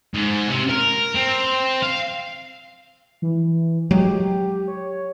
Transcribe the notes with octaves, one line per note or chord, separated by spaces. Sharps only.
G#2
C3
A#4
C4
F5
E3
F#3 G#3 G4
C#5